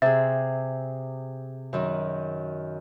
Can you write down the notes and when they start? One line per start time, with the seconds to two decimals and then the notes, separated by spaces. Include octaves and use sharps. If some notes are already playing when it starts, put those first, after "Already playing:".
0.02 C3 G#4 E5
1.73 F#2 D#3